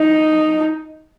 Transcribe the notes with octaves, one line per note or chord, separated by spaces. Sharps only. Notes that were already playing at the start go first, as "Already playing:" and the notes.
Already playing: D#4